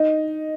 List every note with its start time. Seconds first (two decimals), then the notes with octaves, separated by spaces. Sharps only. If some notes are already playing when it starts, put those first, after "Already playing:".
Already playing: D#4